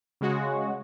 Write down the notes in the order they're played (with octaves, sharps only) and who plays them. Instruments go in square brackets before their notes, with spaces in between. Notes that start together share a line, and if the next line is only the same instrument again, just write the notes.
[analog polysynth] C#3 G#3 F#4